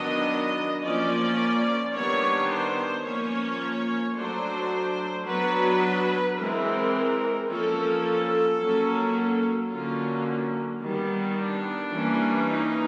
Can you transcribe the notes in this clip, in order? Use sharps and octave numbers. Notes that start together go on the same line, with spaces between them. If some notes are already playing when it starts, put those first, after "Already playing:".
Already playing: D#3 F#3 B3 D4 D#5
F3 A#3 C#4 D5
D#3 G3 B3 D4 C#5
C5
F3 A#3 C#4 C#5
F#3 A3 D4 C5
F#3 B3 D4 B4
E3 G#3 C4 A#4
F3 A#3 C#4 A4
F#3 A#3 C#4
D3 F#3 A#3 C#4 F4
D#3 G3 B3
D4
E3 G3 A#3 C#4
D#4